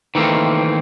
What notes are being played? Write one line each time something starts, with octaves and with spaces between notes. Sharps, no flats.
D#3 E3 A3 A#3 C4